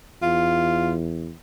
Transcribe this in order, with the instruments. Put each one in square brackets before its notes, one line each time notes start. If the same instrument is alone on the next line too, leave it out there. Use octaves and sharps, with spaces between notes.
[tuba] E2 [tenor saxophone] F4